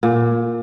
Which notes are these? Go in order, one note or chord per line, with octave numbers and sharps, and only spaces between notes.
A#2